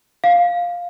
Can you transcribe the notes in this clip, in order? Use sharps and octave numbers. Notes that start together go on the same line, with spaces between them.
F5